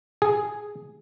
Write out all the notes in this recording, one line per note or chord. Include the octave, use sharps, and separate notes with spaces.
G#4